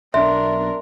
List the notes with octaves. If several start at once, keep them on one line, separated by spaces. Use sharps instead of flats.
B1 D4 A#4 E5 C6